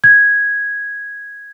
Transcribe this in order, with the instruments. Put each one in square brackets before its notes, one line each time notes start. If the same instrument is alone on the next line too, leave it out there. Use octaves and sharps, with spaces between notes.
[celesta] G#6